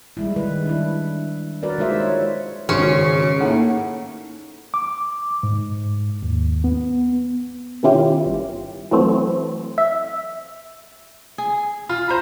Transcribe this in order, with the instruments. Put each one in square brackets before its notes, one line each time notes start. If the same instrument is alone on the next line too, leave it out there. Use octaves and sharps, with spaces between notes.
[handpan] G3 G#3 E4
D#3 B4
D4 E4
F#4 A#4 B4 D5
G#3 D#4 F4 C5 E5
C#5
[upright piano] G#1 [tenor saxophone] C#3 [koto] C#4 [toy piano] F#4 G#4
[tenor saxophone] A2 [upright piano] A#3 F#5 [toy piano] D#4
[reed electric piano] D6
G#2
D#2
B3
[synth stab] B2 D#3 C#4 E4 F4 G4
G1
E3 F#3 A3 C4
E5
[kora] G#4
[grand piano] F4
C5 A#5 B5